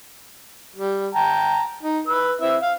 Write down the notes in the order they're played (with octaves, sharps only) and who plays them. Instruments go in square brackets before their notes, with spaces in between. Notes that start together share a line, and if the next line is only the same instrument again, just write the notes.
[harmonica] G3
G5 A5 A#5
D#4
B4 E6
C4 E4 E5
F5